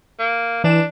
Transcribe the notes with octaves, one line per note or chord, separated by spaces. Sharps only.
A#3
E3 D4 E7